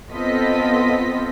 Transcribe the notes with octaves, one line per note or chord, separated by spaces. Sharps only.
B3 C4 F4 A4 D#5 B6